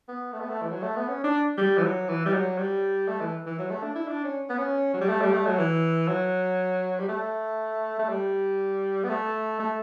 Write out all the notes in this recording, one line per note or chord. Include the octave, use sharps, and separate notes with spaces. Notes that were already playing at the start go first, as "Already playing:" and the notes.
B3
A3
B3
A3
E3
F#3
A3
B3
C#4
D4
G3
E3
F#3
E3
G3
F#3
G3
A3
E3
E3
F#3
A3
D4
E4
D4
C#4
B3
C#4
F#3
G3
A3
G3
A3
F#3
E3
F#3
G3
A3
A3
G3
B3
A3
A3